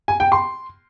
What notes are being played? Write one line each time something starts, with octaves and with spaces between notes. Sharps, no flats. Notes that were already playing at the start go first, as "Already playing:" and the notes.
G#5
G5
C6